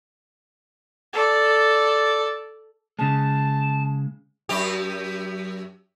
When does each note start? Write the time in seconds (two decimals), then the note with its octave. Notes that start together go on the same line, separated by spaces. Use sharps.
1.13 A4 D5
2.99 C#3 G#3 A5
4.49 F#2 G4